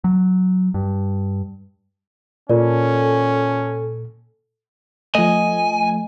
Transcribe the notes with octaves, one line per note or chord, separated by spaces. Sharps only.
F#3
G2
A#2 C#4 F4 A4 A#4 D5
F3 A3 D#5 G#5